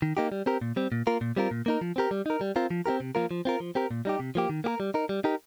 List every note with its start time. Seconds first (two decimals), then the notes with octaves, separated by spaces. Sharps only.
0.02 D#3
0.17 A#3 D#4 G4
0.32 G3
0.46 C4 G4 A#4
0.61 A#2
0.76 G3 C4
0.92 A#2
1.07 A#3 F4 A#4
1.21 A#2
1.37 G3 C4 F4 A#4
1.51 A#2
1.66 A#3 D#4 A#4
1.81 F3
1.96 C4 G4 A#4
2.11 G3
2.26 D#4 A#4
2.41 G3
2.56 C4 F4 A#4
2.71 F3
2.86 C4 D#4 G4 A#4
3.00 C3
3.15 F3 A#3 F4 A#4
3.31 F3
3.45 C4 F4 A#4
3.60 F3
3.75 C4 G4 A#4
3.91 A#2
4.05 G3 D#4 G4
4.20 C3
4.35 F3 A#3 G4
4.50 D#3
4.64 A#3 G4 A#4
4.80 G3
4.94 D#4 A#4
5.09 G3
5.24 D#4 G4 A#4